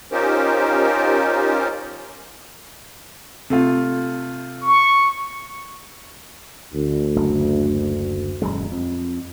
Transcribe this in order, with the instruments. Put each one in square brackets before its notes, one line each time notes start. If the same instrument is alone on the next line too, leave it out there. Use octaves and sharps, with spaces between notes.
[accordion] C#4 D#4 F4 G4 A#4 C5
[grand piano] C3 A3 F4
[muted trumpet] C#6
[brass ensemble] D2
[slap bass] F#1
D#1 F#2 G#3
F2